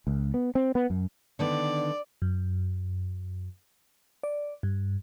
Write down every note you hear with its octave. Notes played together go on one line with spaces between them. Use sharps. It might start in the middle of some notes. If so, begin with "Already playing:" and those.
C#2
B3
C4
B3
F#2
D3 D#3 B3 D5
F#2
D5
G2